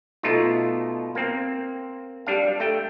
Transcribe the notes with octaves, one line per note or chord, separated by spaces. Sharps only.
B2 A3 D#4 F4
A#3 C4
G3 D4 F5
A3 G5